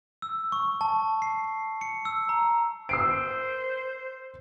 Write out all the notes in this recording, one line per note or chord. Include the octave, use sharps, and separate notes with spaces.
E6
C#6
A5
C7
C#7
E6
A#5
C5 E6 C7 D7